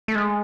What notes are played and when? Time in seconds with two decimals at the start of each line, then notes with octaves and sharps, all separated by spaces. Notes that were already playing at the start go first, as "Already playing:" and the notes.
0.08 A3
0.15 G#3